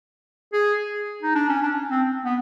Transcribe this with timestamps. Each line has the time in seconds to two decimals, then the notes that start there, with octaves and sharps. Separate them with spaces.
0.53 G#4
1.22 D#4
1.35 D4
1.49 C#4
1.62 D4
1.91 C4
2.25 B3